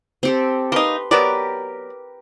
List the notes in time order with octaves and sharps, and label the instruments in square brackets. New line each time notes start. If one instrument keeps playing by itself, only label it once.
[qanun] C4 G4 A4
[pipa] A#3 D#4 [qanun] B4 C6
[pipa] F#3 B3 D5 [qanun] G4 A#4 B4